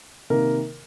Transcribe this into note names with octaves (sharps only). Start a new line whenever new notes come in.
C3 D#3 A#3 A#4